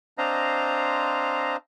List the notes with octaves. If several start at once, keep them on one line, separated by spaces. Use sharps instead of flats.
C4 D4 C5 D#5 F5 A#5